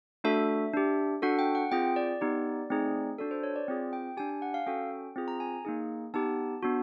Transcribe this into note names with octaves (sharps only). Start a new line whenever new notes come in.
A3 D4 F#4 A4 E5
D4 G4
D4 F#4 A4 F#5
G5
F#5
C4 F4 G#4 G5
D5
B3 D#4 G4
A3 C4 D#4 G#4
D4 F#4 A4 D5
C5
C#5
D5
C4 F4 G#4
G5
D4 G4 G#5
G#5
F#5
F5
C#4 F#4 A4 G5
C4 F4 G#4
A#5
G#5
A#3 D#4 G#4
B3 D#4 G4 A5
B3 D4 F#4